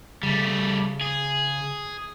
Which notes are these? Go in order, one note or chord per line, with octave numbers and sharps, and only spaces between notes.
C#3 G3 A3
G#4